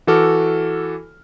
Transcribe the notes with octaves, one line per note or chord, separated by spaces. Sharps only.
E3 F#4 A4 D6 F6